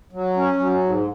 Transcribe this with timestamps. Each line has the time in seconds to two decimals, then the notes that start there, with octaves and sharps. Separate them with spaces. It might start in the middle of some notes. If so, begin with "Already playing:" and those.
0.13 F#3
0.36 C#4
0.59 F#3
0.84 G#2